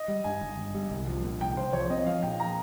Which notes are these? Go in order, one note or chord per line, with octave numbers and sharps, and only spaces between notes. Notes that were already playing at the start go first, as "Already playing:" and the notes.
Already playing: D#5
G3
G2 G#5
G1
G1
G3
C2
F3
A#2
C2 G5
C2 C5
F3 C#5
C4 D#5
F3 F5
A#2 G5
A#5